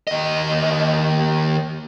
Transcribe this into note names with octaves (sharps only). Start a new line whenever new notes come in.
D#2 D#5